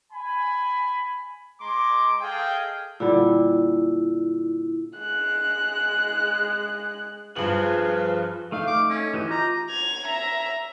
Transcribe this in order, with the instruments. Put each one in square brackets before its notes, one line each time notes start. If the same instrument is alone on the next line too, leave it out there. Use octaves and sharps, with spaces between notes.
[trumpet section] G#5 B5
G#3 A#5 C6 D6
G#4 A4 D#5 F5 G5
[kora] A#2 D3 G3 [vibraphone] E4
[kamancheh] G#3 F#6
[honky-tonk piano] G2 F#7 [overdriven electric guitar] F3 [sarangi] G#4 [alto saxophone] B4
[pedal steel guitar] A3 D#4 [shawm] F5
[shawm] D6
C#4
[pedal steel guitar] E3 G4 D#5
[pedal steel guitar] F4 D6 G6 [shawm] A#5
[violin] G#6 F7
E5 A#5